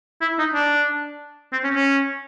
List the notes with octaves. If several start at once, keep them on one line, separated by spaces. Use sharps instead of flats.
E4
D#4
D4
C4
C#4
C#4